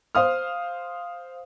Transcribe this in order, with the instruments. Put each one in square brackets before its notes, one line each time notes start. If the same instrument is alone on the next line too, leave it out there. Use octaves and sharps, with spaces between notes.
[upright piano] C5 F5 D#6 F6